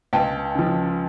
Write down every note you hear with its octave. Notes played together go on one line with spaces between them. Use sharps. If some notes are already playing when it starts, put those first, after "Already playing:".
C#2 G5 A5
C#3 F3